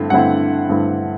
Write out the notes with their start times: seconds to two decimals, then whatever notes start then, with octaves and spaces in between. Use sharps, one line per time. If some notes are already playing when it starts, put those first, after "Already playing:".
Already playing: G2 D3 A3 C4 E4
0.10 G2 D3 A3 C4 E4 F#5
0.69 G2 D3 A3 C4 E4